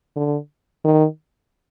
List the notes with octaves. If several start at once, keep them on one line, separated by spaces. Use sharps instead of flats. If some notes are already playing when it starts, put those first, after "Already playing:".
D3
D#3